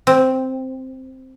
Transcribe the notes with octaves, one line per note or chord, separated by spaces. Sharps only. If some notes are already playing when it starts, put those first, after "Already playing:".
C4